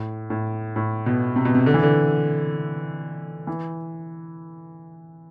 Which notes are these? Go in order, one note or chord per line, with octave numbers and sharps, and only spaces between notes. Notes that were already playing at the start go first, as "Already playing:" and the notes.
Already playing: A2
A2
A2
B2
C3
B2
C3
D3
E3
D3
E3